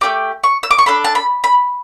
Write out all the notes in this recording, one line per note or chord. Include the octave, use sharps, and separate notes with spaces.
A3 D4 G4 D6
C#6
E6
D6
C#6
D4 A4 B5
A5
B5
B5